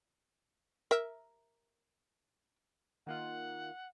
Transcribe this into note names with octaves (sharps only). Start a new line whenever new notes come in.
A#4 E5
D#3 A#3 F4 F#5